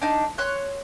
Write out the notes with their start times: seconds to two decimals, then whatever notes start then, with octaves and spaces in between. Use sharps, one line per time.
0.02 D4 D#4
0.38 C#5 C6 F#6